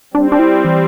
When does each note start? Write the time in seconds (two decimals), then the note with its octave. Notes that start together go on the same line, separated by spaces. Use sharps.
0.13 G3 C4 D4
0.32 D4
0.39 E4
0.65 E3